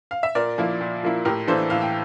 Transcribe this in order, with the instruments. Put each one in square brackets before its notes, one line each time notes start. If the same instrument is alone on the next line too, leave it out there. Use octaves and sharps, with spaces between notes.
[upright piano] F5
E5
A#2 A#4 D5
F3 A#3 E4
A#2
F3 A#3 E4
A2 G4 A#4
E3 A#3 D4 A4 C5
A2 F5
G5